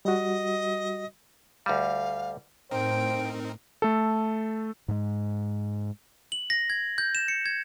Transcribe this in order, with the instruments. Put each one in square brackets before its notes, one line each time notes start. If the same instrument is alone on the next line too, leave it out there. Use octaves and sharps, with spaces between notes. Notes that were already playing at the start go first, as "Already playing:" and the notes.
[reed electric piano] G3 F#4 [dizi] D#5
[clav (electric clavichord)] D2 G3 [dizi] F5
[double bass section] A2 [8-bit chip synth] C4 D#4 A#4 [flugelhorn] C5 [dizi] G5
[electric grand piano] A3 A4
[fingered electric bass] G#2 G#3
[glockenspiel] F#7
A#6
G#6
G6
E7
C#7
G#6